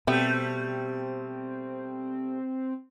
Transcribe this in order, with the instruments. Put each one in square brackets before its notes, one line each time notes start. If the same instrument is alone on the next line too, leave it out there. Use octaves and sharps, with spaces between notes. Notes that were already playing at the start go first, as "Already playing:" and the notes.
[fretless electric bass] B2 [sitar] G3 A3 [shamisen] B3 G4 E5 [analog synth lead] C4